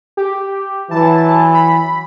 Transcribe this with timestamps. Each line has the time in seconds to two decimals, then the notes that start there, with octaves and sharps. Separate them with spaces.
0.17 G4
0.91 E3 F#3 A5
1.55 B5